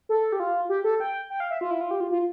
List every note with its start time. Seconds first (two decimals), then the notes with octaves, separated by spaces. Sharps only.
0.09 A4
0.32 G4
0.40 F4
0.69 G4
0.84 A4
1.00 G5
1.30 G5
1.40 F5
1.51 E5
1.61 F4
1.71 E4
1.81 F4
1.91 G4
2.00 F4
2.11 F4